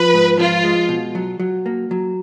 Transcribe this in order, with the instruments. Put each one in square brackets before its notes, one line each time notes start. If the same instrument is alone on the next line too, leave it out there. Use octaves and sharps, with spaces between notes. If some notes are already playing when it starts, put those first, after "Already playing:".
Already playing: [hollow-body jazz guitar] F3 [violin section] B4
[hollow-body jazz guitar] G#2
[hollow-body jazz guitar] F3 [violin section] F4
[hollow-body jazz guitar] G#3
B2
F#3
F#3
A#3
F#3